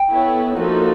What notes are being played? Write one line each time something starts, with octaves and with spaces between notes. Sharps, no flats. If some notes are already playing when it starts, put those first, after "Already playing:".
Already playing: G5
B3 E4 A4 C#5
F3 A#3 D#4 F#4 A4 F#5